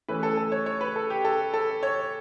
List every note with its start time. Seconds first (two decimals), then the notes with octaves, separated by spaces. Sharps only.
0.08 E3 A3 C#4 B4
0.23 A4
0.37 A4
0.52 C#5
0.66 C#5
0.81 B4
0.96 A4
1.10 G4
1.25 A4
1.54 A4
1.83 C#5